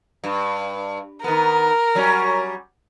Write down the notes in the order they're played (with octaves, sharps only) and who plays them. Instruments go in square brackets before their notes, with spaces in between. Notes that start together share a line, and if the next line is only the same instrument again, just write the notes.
[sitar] G2
[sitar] D#3 B3 [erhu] A#4
[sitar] F#3 G3 C#4